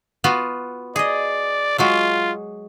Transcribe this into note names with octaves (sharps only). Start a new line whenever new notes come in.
B3 F4 F#4
G#4 D5 D#5
F#3 G#3 F4 F#4